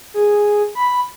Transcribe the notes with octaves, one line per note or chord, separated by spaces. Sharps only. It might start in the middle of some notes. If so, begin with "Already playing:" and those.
G#4
B5